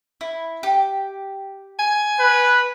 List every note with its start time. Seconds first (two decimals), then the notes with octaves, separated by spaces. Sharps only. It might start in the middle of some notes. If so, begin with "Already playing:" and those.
0.21 E4
0.63 G4
1.79 G#5
2.19 B4